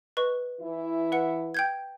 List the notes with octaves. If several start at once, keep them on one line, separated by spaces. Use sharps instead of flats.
B4 D#5 C#6
E3 E4
B4 F#5 C#7
G5 G6 G#6